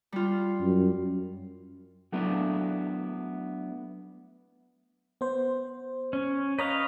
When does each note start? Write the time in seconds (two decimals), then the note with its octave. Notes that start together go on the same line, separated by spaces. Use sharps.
0.12 G3 F4
0.61 F#2
2.12 F#3 A3 B3 D4 E4
5.21 B3 C5
6.13 C#4
6.59 B4 C#5 D#5 F5 A#5